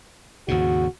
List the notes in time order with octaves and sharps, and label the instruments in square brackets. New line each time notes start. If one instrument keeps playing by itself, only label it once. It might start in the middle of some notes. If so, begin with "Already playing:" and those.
[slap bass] D#2 G#2 C#3 [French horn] F#4